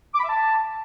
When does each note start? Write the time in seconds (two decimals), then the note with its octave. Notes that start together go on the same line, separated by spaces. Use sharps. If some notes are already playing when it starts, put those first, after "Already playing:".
0.13 D6
0.18 B5
0.23 E5
0.29 A5